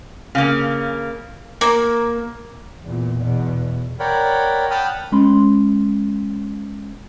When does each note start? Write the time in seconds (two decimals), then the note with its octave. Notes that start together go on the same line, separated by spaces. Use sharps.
0.35 C#3 A#3 F5
1.61 A#3
2.83 E2 A#2
3.21 E2 B2
4.00 A#4 C#5 D5 F#5 G5 B5
4.71 F#5 G5 A5 B5 D#6 F6
5.12 G#3 C#4 B5 C6